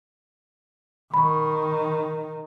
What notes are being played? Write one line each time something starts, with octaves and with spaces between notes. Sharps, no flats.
D#3 B5 C#6